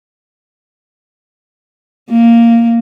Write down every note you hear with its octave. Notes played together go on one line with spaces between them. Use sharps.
A#3